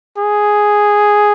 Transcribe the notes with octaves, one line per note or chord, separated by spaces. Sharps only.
G#4